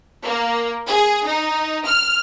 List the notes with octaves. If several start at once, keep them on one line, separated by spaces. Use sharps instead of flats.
A#3
G#4
D#4
F6